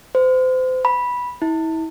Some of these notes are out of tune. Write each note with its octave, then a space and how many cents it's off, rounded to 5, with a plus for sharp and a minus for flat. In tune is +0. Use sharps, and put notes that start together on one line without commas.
C5 -30
B5 -10
E4 -35